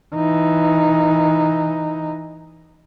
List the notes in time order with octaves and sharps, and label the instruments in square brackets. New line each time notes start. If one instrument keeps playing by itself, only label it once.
[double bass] E3 D#4